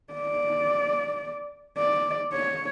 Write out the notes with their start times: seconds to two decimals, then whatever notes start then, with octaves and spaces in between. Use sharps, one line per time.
0.13 D5
1.78 D5
2.33 C#5